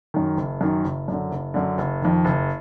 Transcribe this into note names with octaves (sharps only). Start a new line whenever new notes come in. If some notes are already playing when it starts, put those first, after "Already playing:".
F#2 D#3
F#1
F#2 D#3
F#1
F#2 D3
F#1
F#2 D3
F#1
F2 D#3
F#1